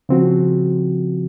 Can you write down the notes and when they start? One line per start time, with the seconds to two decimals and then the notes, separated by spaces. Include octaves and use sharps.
0.09 C#3 F3 C4 F#4